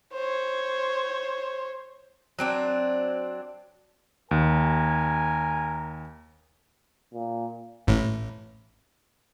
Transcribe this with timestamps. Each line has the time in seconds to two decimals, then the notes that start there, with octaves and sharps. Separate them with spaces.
0.13 C5 C#5
2.39 F#3 C4 D4
4.31 D#2 A#4 G#5
7.14 A#2
7.87 A1 A2